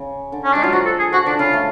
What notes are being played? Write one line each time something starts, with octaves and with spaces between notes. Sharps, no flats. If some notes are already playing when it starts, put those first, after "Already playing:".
Already playing: C#3
D3
C#4
G#3 D4
F#3 F4
F3 F#4
A4
G#4
F3 F#4
D3 D4
C#3 F4
A3